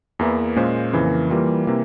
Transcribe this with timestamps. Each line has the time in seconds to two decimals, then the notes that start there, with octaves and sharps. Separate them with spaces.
0.19 E2 E3 A#3 E4
0.56 A#2 G#3 C#4 F4 C5
0.93 F2 C#3 E3 A#3
1.30 E3 G3 A#3 F4
1.67 C3 E3 A#3